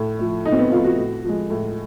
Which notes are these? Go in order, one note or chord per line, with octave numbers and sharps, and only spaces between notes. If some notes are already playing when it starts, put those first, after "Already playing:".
Already playing: A2
F3 A3
A2 D#4
C4
B3
F3 A3 F4
F#4
A2
F3 G#3
A2